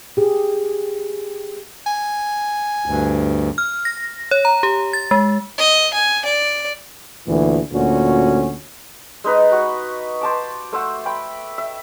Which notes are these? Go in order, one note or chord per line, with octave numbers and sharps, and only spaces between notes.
G4 G#4
G#5
D2 G2
F6
A#6
C#5
A#5
G4
A6
G#3
D#5
G#5
D5
D2 A#2 E3
D2 A#2 C#4 F#4
G#3 D#4 B4 D#5
F#4 C#6
C5 A5 D6
A3 C5 E5 F#5
G5 B5
E5